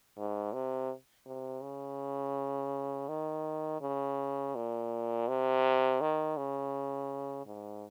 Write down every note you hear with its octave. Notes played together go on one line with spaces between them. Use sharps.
G#2
C3
C3
C#3
D#3
C#3
A#2
C3
D#3
C#3
G#2